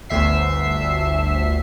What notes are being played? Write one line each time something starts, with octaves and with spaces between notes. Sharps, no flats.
G1 D2 E5 C7